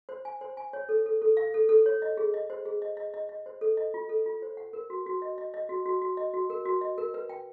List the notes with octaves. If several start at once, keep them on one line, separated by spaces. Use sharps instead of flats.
C5
G#5
C5
G#5
C#5
A4
A4
A4
F5
A4
A4
C#5
D#5
G#4
D#5
C5
G#4
D#5
D#5
D#5
D#5
C5
A4
D#5
F4
A4
F4
C5
F#5
A#4
F#4
F#4
D#5
D#5
D#5
F#4
F#4
F#4
D#5
F#4
A#4
F#4
D#5
A#4
B4
G5